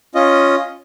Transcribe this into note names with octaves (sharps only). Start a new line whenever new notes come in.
C#4 F4 D#5